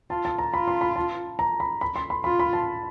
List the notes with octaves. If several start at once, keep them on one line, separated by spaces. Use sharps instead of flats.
F4 A5
A5
A#5
F4 B5
C6
B5
A5
A#5
B5
B5
C6
B5
F4 B5
B5
A5